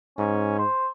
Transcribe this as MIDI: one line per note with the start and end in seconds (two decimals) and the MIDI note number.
0.18 0.63 44
0.18 0.58 61
0.58 0.88 72